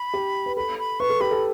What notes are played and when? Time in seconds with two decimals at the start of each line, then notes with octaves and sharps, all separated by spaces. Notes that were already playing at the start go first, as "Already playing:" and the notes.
Already playing: B5
0.13 G4
0.46 B4
0.56 A4 B5
0.79 B5
1.00 B4 C#6
1.10 A4
1.20 G4 B5
1.31 A4